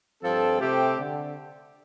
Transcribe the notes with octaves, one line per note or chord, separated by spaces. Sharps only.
G2 F3 C4 A4
C3 A3 C4 G4
D3